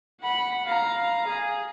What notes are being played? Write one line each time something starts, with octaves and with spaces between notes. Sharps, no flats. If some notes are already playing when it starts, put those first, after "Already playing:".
F#5 B5
F5 A#5
G#4